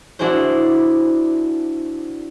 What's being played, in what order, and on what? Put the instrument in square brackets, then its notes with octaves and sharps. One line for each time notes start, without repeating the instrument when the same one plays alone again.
[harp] D4 E4 F#4 G#4 C5